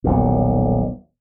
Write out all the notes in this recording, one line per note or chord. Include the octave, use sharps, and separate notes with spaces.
D#1 B1 A#2